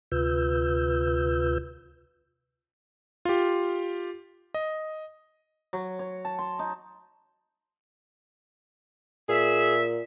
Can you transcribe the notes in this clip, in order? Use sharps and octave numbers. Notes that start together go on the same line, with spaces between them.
D2 C3 F4 B4 E6 G6
F4 G4
D#5
F#3
C#5
A5
C6
D#4
A#2 G#4 E5